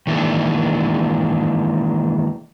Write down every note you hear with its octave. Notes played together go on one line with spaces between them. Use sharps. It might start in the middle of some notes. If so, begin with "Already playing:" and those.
D#3 E3 G#3 A#3 D4 D#4